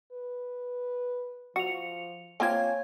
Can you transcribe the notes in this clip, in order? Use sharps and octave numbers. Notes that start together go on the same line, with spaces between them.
B4
F3 F#4 C#7 F7
A#3 C4 F4 C#5 G#5 G#6